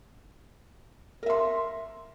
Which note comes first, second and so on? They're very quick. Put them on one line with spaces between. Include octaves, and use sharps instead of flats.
A#4 E5 C6